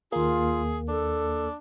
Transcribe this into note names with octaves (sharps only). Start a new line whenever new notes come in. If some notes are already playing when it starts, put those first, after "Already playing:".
D#2 A#3 F4 G#4
D4 A4